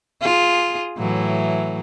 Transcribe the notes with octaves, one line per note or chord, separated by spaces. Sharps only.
F4 G#4
A2 E3 F#3